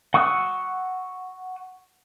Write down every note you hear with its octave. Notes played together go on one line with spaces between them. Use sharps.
F#5 C#6 D#6 E6 F#6